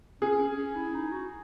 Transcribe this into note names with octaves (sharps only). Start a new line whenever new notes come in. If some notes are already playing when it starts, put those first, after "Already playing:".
C#4 G#4
C#4
C#4
E4
D#4
F#4